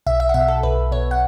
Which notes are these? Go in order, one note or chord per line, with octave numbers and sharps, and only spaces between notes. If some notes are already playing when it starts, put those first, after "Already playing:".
B1 E5
E5
F#5
B2 E5
A4
B1 B4
B2 C#5
F#5